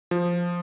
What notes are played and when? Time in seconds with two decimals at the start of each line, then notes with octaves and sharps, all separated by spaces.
0.11 F3